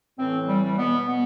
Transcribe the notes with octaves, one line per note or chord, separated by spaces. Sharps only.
A2 E3 C4
G3
G3
B2 B3
B3